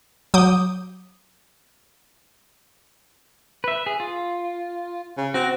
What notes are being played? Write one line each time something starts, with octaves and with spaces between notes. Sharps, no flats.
F#3 D6 D#6 G6
B4 E5
G#4
F4
C#3
C4 F#4